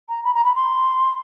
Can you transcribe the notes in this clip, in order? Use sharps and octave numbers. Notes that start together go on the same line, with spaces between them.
A#5
B5
A#5
B5
C6